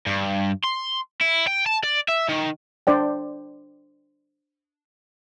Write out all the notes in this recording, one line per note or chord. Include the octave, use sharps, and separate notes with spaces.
G2
C6
E4
G5
A5
D5
E5
D#3
D4 C5 D5 G5